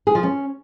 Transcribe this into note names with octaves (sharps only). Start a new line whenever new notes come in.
G#4
F3
C#4